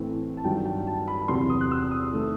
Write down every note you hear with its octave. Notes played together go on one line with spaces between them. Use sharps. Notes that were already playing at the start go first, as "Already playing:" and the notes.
Already playing: A2 E3 A3 C4
A5
G2 D#3 F#3 G5
G5
A5
B5
B5
E2 C3 F#3 C4 C6
D#6
F#6
E6
D#6
D#3 A3